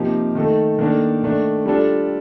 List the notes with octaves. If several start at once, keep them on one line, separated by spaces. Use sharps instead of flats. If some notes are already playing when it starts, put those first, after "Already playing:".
Already playing: C3 F3 A#3 D#4 G4
D#3 A3 D#4 A4
D#3 A#3 D4 A4
D#3 A3 D4
G3 D4 F4 A4